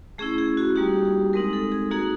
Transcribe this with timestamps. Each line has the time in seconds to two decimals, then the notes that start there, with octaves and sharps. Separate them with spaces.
0.18 A3 C#4 E4 G#4
0.38 G#4
0.57 F#4
0.76 G3 A#3 D#4 F#4 G4
1.05 G#4
1.33 G#3 C4 D#4 A#4
1.53 A4
1.72 G#4
1.91 A#3 D#4 F#4 G#4